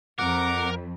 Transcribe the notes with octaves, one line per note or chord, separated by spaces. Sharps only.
F2 A#4 F#5 D6